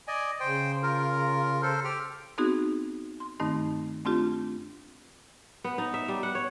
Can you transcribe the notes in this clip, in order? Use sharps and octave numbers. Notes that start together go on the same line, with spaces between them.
D5 D#5 G#5
C#3 C5 G5
F4 A#4
A4 C5
G4 G5 F6
B3 C4 D#4 F#4 G#4
C6
G2 D#3 A3 C4 D#4
A3 C4 D4 F4 G4
B3
D#4
E5
G3
F#5
C#5